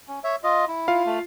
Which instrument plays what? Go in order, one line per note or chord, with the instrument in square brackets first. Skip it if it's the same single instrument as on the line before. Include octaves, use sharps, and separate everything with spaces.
[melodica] C#4
C#5 E5
F4 D#5
E4
[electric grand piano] F4 F5
[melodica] A3